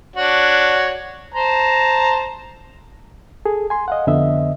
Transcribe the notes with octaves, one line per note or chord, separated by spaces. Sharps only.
D4 F#4 C#5
C5 A5 A#5
G#4 A4
G#5 C6
D#5 F5 F#5
F2 D3 B3 D#5 E5